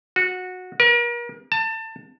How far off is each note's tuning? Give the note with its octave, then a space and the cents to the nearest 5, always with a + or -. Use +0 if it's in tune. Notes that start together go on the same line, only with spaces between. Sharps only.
F#4 -15
A#4 +40
A5 +25